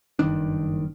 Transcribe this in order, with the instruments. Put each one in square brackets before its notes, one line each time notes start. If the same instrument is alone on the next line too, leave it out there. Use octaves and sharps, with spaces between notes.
[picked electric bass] F#1 G2 D#3 D4